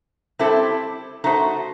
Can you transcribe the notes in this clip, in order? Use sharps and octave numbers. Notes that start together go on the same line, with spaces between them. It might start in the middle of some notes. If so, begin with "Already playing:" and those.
G3 C4 E4 A4 C5
A3 D#4 F#4 C5